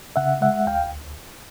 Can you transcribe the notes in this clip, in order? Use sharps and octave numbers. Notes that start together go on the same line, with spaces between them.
C#3 E5 F#5
G#3 E5 F#5
D2 F5 G5